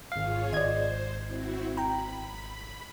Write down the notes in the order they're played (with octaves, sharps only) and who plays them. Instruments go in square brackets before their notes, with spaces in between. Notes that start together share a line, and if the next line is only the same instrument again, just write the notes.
[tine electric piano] G#1 F5 [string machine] F4 G#4 C#5
[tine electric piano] G#1 G#6 [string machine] C5 [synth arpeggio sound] D5 D#5
[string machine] C4 E4 F#4
[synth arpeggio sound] G5 A#5 [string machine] B5